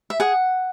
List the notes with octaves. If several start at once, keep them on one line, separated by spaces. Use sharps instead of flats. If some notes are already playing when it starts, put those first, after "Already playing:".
E5
G#4 F#5